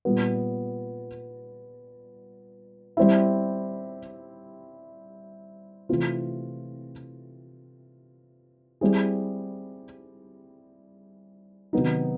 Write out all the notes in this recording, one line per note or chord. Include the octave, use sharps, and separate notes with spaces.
A#2 G3 B3
G3 C4 E4
C3 E3 A3 C4 F4
G3 C4 E4 G#4
C3 D#3 F#3 B3 D#4